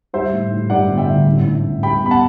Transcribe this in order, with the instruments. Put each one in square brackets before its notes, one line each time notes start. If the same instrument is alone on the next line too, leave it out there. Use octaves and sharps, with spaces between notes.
[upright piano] G3 [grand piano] C5 E5
[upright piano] A2
A2
[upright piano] G2 [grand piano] D5 F#5
[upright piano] G1
[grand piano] E5 G5
[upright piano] D3
A1
A2
A1
[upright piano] G3 [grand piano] G5 B5
[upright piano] B3 [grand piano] B5
[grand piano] F#5 A5